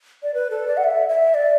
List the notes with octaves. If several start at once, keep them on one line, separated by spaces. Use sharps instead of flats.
D5
B4
A4
D5
F#5
E5
E5
D5